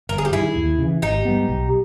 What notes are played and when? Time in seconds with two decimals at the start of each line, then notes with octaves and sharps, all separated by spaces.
0.09 G1 A#4
0.18 G#4
0.25 G4
0.33 G2 D#3 G3 E4 G#4
0.56 D#2
0.78 C#3 E3
1.02 G#1 D#4 G4
1.25 G#2 G3 B3
1.48 B1